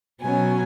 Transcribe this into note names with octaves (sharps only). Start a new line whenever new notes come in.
B2 F#3 C#4 G#5